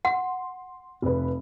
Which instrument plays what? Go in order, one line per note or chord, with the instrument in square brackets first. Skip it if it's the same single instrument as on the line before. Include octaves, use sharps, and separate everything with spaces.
[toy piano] F#5 [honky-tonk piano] C6
[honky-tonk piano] F1 B4